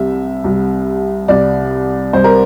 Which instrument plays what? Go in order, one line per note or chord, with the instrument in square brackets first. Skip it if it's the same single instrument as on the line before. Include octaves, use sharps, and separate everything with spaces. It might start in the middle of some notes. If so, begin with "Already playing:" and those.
Already playing: [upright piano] C2 C3 G3 E5
C2 C3 G3
C2 C3 G3 D5
C2 C3 G3 C5
A#4